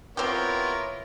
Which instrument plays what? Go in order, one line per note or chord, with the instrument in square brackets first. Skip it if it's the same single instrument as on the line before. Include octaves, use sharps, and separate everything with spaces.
[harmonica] B3 C#5 [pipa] C4 G4 [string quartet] E4 F4 [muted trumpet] A#4